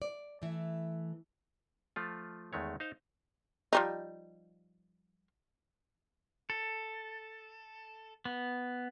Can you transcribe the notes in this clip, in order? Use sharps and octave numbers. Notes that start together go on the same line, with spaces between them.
D5
E3 A3
F3 A3 F4
E2 D#3 G#3 A3 C#5
D#4 C5 F5
F3 G3 D#4
A4
B3